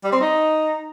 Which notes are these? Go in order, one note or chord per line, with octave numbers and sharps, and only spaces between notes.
G3
C4
D#4